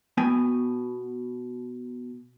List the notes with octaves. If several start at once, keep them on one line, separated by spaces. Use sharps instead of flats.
B2 B3 G5 G#5